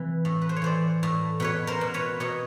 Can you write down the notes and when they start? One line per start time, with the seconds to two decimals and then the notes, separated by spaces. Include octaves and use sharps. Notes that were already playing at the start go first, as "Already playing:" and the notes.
Already playing: C3 E3
0.25 A2
0.42 B4
0.49 C5
0.56 C#5
0.62 E3 C5 D5
1.03 A2
1.40 B2 B4 C#5
1.67 A#4 C5
1.81 B2
1.94 B4 C#5
2.20 B2 C#5 D#5